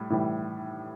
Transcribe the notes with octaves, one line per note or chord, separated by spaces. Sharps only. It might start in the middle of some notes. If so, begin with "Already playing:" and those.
Already playing: A2 G3
A2 E3 G3